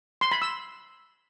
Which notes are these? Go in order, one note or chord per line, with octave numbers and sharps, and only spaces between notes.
C6
B5
E6